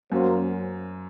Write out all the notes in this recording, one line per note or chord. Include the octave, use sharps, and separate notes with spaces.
F#2 F#3 A#3 C#4 F#4 C5